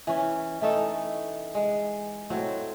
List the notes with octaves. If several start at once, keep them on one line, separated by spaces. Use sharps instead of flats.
E3 C#4
E3 A3 D#4 A4
G#3
A2 F#3 C4